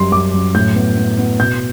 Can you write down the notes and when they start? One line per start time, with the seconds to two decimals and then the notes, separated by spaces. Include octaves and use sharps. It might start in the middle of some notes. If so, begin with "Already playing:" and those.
Already playing: F#2 G3 C6
0.12 F#2 D6
0.34 F#2
0.54 A2 G6
0.75 B3
0.97 B3
1.18 B3
1.39 B2 G6